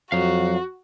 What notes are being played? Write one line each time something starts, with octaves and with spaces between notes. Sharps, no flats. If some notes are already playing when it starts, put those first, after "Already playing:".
F2 F#3 F#4 F5